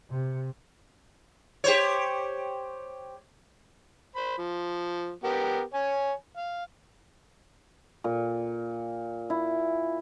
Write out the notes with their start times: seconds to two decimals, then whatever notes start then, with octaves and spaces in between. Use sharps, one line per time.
0.10 C3
1.64 G4 C5 C#5
4.16 C5 B5
4.38 F3
5.24 B3 G4 A#4
5.74 C#5 G#5
6.37 F5
8.04 A#2
9.30 E4